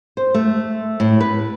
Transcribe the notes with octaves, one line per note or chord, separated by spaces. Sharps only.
C5
A3
A2
B4